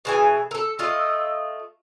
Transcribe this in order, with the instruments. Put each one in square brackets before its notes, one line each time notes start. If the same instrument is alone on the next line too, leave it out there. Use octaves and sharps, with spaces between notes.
[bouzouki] B2 E3 G#5 [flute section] G#4
[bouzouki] A4 A#4 [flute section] E6
[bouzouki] A3 F4 D#5